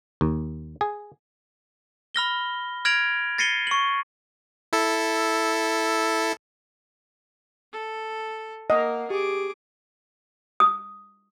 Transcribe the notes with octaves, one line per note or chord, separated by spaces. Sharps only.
D#2
G#4
B5 F6 A#6 G7
F6 G#6 A#6 D7 F7 F#7
A6 A#6 C7 C#7 D#7 G7
C#6 F#7
E4 A4
A4
A#3 A#4 D#5 F#5
G4 G#4 D6
D#6